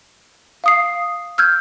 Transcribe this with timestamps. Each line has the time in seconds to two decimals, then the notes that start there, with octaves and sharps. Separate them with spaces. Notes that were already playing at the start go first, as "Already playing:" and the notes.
0.64 F5 D#6 C7
1.38 E6 F6 G6 G#6